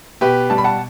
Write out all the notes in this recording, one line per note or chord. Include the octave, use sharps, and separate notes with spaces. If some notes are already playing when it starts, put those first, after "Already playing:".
B2 G4 B4
G3 A5
B5
F#5 A5